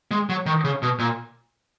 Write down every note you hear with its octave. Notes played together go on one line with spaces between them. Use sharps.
G#3
F#3
D#3
C#3
B2
A#2